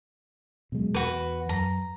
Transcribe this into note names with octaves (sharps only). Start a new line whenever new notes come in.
B2 F#3 G#3
E2 F#4 B4
F#2 A#5